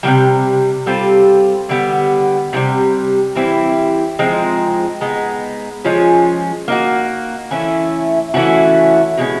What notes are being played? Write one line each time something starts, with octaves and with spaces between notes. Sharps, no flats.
C3 D#3 G3
G3 C4 F4 A4
D3 G3 B3
C3 E3 G3
E3 G3 C4 E4
F3 G#3 C4 D#4
G#3 B3 D#4
F3 G#3 C#4 F4
A#3 D#4 F#4
E3 A3 C#4 E4
E3 A3 C#4 F#4
B2 G#3 C#4